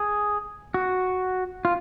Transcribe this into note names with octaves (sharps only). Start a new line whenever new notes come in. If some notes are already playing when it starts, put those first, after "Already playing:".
Already playing: G#4
F#4
F4